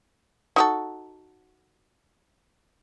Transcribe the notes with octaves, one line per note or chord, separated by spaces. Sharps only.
D#4 F#4 A4